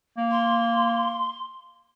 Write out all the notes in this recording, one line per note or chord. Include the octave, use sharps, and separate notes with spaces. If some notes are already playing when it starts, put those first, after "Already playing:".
A#3
C6